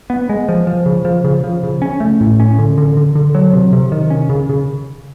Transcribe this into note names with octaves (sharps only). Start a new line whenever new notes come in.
B3
G#3
F3
F3
C#3
F3
C#3
F3
C#3
C#4
A3
A2
C#4
D3
D3
D3
D3
F#3
C3
C3
D#3
C#4
C#3
C#3